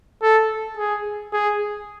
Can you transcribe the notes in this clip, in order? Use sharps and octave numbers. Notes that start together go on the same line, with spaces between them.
A4
G#4
G#4